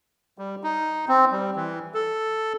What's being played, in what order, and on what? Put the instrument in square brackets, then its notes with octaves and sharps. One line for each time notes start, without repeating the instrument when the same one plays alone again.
[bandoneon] G3
D#4
C4
G3
E3
A4